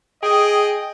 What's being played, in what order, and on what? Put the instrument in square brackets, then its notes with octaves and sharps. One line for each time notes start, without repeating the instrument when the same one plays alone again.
[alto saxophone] G#4 [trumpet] D#5 [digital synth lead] G5